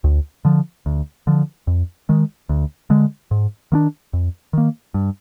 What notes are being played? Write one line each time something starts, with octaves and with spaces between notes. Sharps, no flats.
D2
D3 F3
D2
D3 F3
F2
D#3 G#3
D2
D3 G#3
G#2
D#3 A#3 D4
F2
D#3 A#3
G2